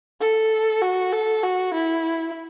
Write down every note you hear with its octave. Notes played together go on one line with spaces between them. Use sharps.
A4
F#4
A4
F#4
E4